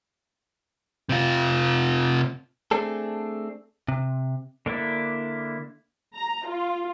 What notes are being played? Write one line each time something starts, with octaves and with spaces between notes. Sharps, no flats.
C3 F4
A3 C4 D4 G#4 A4
C3
D3 A#3 D4 E4
A#5
F4